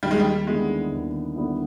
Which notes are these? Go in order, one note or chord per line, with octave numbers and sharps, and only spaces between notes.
D#2 G3
G#3
G3
D3 G3 G#3 B3 E4
D#2
D3 G3 B3 E4